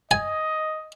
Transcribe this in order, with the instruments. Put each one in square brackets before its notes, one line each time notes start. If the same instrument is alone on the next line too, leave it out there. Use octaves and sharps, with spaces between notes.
[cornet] D#5 [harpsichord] G#5